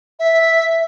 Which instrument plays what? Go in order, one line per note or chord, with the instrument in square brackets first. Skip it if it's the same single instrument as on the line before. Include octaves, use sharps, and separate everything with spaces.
[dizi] E5